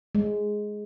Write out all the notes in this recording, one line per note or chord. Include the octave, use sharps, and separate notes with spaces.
G#3